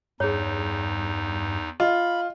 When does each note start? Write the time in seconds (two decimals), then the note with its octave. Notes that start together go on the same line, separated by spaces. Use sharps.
0.20 E2 G2 D#4 G#4 C#5
1.80 F4 D#5 B5